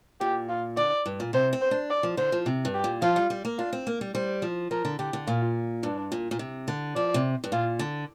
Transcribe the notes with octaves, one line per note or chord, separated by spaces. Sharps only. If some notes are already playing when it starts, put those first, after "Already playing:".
A#2 G4
F4
D3 D5
G2
A#2
C3 C5
C4
C5
D4
D5
F3
D3 C5
F3
C3
G2
G4
A#2
F3 F4
G3
G3
A#3
D4 F4
C4
A#3
G3
G3 C5
F3
F3 A#4
D3
D3 G4
D3
A#2 F4
G2 D4
A#2
A#2
C3
D3
F3 D5
C3
G2
A#2 F4
D3